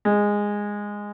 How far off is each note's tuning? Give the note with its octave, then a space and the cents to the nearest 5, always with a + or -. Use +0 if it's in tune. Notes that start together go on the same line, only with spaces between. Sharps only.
G#3 -10